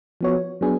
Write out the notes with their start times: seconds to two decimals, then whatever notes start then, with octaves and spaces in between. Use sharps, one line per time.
0.21 F3 B3 F#4 C#5
0.61 F#3 B3 D4 G#4